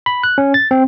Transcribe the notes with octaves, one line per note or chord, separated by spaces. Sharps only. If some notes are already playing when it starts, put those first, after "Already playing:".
B5
F#6
C#4
A6
C4